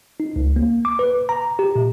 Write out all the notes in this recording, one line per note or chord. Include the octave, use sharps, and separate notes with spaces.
D#4
C#2
A#3
D6
B4
A#5
G4
A#2